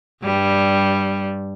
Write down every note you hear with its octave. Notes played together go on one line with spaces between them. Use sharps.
G2 G3